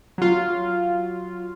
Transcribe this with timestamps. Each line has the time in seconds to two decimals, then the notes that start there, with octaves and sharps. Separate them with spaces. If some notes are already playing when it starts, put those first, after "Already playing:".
0.18 F#3 F4